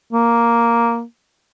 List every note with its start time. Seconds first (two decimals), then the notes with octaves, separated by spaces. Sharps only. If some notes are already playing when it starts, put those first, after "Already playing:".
0.13 A#3